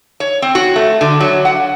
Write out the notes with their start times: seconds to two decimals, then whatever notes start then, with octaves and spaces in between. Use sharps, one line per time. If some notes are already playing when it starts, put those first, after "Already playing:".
0.20 C#5
0.42 C4
0.55 F#4
0.76 A3
1.01 D3
1.20 F#3
1.45 F#5